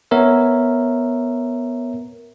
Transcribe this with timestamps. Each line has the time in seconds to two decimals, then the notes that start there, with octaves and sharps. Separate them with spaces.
0.11 B3 A#4 C#5 E5